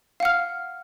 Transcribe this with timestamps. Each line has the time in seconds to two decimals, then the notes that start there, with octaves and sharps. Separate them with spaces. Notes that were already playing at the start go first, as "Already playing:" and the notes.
0.20 F5
0.23 F#5
0.25 F6